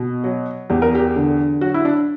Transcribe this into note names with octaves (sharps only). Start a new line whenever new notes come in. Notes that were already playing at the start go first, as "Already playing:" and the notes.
Already playing: B2
F#3
E2 G4
A#4
G4
D3
F#3 F#4
E4
D4